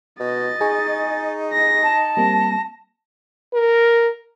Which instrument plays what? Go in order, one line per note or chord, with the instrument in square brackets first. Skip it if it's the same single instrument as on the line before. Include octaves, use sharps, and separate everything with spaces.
[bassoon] B2 [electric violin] D#5 A6
[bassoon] D#4 [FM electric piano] G#4 G#5 C#6
[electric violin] A#6
[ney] A5
[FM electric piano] G3 A#3 C4 [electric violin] A#6
[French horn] A#4